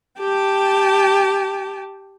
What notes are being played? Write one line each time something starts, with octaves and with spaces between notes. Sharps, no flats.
G4 G5 A5